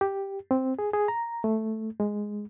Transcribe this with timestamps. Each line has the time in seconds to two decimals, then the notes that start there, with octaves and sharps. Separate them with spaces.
0.01 G4
0.51 C4
0.79 G#4
0.93 G#4
1.08 A#5
1.44 A3
2.00 G#3